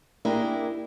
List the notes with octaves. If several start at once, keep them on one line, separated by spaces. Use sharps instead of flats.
A#3 D4 E4 G4 G#4 A#4